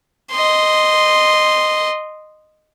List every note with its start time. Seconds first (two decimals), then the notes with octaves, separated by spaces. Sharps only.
0.31 D#5 C6